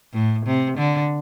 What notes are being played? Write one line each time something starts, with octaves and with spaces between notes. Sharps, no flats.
A2
C3
D3